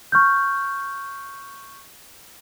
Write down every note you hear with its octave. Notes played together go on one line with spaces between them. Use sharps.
C#6 F6 G6